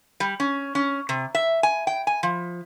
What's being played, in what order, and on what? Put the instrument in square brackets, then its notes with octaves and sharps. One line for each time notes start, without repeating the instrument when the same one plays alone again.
[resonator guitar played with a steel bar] G3
C#4
C#4
C3
E5
G#5
G5
G#5
F3